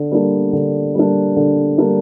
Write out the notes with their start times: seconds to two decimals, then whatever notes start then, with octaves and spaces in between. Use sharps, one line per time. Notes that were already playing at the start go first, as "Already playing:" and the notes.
Already playing: D3
0.12 G3 A#3 D4
0.53 D3
0.95 G3 A#3 D4
1.36 D3
1.78 G3 A#3 D4